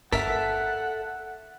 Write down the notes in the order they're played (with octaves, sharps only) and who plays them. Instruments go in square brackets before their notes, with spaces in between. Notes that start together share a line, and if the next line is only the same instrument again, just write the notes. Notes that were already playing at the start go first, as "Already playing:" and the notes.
[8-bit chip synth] G1 A#4 B6 [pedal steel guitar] A4 E5 A5 [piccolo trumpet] F#5